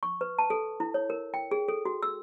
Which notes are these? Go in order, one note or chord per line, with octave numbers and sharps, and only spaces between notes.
C#6
B4
A5
A4
E4
C#5
A#4
G5
G#4
A4
F#4
E6